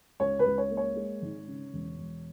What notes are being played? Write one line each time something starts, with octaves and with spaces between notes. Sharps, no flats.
C#2 C#5
B4
C#2
C#5
A#3
C#5
G#3
G#1
C#3
E1
E1